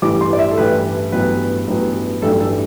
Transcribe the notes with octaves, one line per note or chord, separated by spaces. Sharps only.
A1 G2 E3 G3 D6
C6
D5
E5
A4
A1 G2 E3 G3 B4
A1 G2 F#3 B3 B4
A1 G2 F#3 B3
A1 G2 F#3 A3 D4 A4
A4